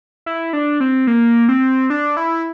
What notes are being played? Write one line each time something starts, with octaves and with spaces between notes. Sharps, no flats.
E4
D4
C4
A#3
C4
D4
E4